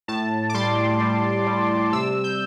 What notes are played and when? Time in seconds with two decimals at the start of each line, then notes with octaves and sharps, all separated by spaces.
0.08 A2 A5
0.50 D6
0.54 G3 C6
1.00 G3
1.47 G3
1.93 C3 E6
2.24 G6